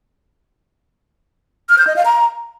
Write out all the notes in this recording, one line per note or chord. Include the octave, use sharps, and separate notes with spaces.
F6
G6
D#5
F5
A#5